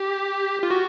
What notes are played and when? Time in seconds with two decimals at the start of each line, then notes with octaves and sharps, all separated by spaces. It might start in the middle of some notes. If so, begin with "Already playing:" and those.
Already playing: G4
0.63 F4
0.70 F#4